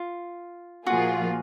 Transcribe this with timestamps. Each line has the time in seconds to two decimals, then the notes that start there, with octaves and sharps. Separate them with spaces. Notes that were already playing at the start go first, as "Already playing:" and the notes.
Already playing: F4
0.87 A#2 F3 A#3 F4 F#4 G#4